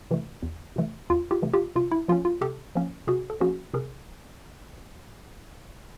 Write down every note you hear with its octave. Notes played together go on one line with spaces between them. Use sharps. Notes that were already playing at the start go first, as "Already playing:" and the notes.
C3 E3 A3
E2
C3 E3 A3
E2 F4
F4 G4
C3 E3 A3
F4 G4
C3 F4
E4
F3 A#3 C#4 F4
F4
C3 G4 A4
F3 A#3 C#4
C3 F#4 G#4
A4
F3 A#3 C#4 F#4 G#4
C3 G#4 A#4